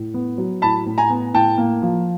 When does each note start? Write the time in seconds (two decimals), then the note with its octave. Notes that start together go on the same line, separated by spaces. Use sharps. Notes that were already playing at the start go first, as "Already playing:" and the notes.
Already playing: A2
0.14 B3
0.38 F#3
0.62 A2 A5 B5
0.86 A2
0.98 G#5 A#5
1.10 B3
1.34 A2 G5 A5
1.58 A#3
1.82 F3